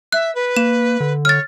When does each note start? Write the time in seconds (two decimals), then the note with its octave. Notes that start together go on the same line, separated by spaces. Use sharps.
0.12 E5 F#6
0.35 B4
0.56 A#3 E7
1.00 D3
1.25 C#5 F6 A6